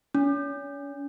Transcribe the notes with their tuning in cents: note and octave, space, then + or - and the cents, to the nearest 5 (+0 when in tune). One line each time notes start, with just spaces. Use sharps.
C#4 +40